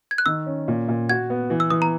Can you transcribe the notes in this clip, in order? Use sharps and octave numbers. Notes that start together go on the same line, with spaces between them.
G#6
F#6
D#3 E6
C#4
A#2
A#2
F#4 G#6
B3
E3
E6
E3 D#6
A#5